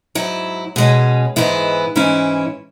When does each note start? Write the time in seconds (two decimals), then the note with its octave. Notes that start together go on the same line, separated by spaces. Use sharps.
0.15 G#2 F#3 E4
0.76 B2 G#3 C#4
1.36 G#2 E3 G#3 B3 E4
1.96 G#2 E3 C#4 E4